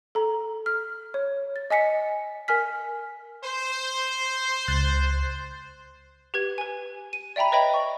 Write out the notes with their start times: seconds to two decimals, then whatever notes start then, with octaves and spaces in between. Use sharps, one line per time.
0.15 A4 A#5
0.66 F6
1.14 C#5
1.56 A6
1.70 D#5 G#5 B6 C#7
2.48 A#4 G#5 F6 B6
3.45 C5
4.68 C#2 F#6 A6
6.34 G4 B4 G#6
6.58 B4 G#5
7.13 D#7
7.36 D5 E5 G5 A#5 B5
7.52 B4 C#5 D#5 E5 G5 B5
7.74 C#6